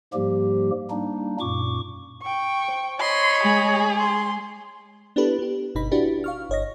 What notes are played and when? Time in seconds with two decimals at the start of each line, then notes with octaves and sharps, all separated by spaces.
0.14 G#2 F3 G3 A#3 G4
0.91 G3 A#3 D4 D#4
1.40 F#2 A#2 C#6 D6
2.23 G5 C#6
2.68 C5
3.00 C#5 D#5 B5 C6
3.44 G#3 G#4
3.99 C6
5.16 B3 D4 E4 G4 A4 B4
5.39 B3 G4
5.75 G1 B2 D#4 B5
5.91 D4 E4 F#4 G4 B4
6.24 F5 C#6 F6
6.50 G1 C#5 D#5 A#6